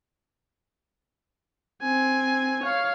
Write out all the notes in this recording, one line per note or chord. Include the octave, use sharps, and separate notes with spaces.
C4 G#5
C#5 F5